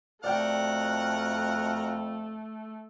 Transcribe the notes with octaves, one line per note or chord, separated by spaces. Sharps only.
F2 A3 F#4 A#4 D5 F#5 G5